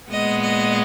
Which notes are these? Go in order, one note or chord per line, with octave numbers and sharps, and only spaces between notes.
A#2 G#3 B3 D#5
D#5